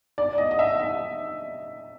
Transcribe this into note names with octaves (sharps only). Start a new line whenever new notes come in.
D5
D5
D#5
D#5
E5
E5